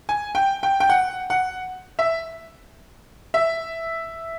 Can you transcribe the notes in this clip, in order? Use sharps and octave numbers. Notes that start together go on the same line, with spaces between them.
G#5
G5
G5
G5
F#5
F#5
E5
E5